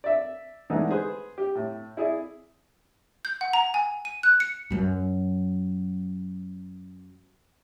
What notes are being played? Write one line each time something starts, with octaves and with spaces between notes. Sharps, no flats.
D5 E5
D3 E3 G#3 A3 D4 D#4
G#4 B4 C5
G4
A2
E4 G#4 D5
G6
F#5
A#5
G#5
D#7
F#6
C#7
F#2 F#3